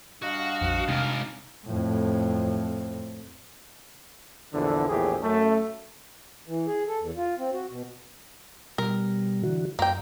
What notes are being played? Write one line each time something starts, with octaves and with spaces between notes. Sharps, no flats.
G2 F#4 D#5 F5
A#1 F2
G#2 C3 A#4
F2 A2
A#1 E2 D3
A#1 E2 A2 G4 G#4
F#2 A3
E3
G#4
A4
E2
F4
C4
F#4
B2
B2 G3 A#4
D3 E3 F#4
F#2 A#3 G5